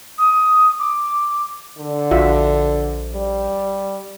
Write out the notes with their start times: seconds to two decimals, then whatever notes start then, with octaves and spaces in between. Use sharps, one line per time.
0.18 D#6
0.79 D6
1.78 D3
2.11 A#1 F4 F#4 E5
3.13 G3